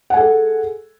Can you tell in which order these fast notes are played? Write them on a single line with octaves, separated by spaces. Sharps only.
F#5 G#5 A4 G#4